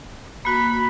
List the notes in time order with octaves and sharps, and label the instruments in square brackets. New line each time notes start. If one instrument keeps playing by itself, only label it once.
[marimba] A#3 F#4 [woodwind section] B5